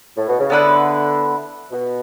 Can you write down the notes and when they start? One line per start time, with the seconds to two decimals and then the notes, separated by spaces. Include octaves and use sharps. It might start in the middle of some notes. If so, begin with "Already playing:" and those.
0.16 A2
0.27 B2
0.39 C#3
0.50 D3 B3 E4 B4 F#5
1.71 B2